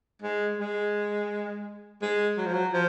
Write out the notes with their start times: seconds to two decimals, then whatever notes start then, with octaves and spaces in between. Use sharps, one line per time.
0.22 G#3
0.58 G#3
2.02 G#3
2.37 F#3
2.46 F3
2.53 F#3
2.73 F3